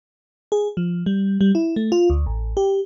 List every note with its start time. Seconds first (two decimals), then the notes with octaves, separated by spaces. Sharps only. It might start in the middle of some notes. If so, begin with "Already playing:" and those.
0.52 G#4
0.77 F3
1.06 G3
1.41 G3
1.55 E4
1.76 A3
1.92 F4
2.10 D2
2.26 A1
2.57 G4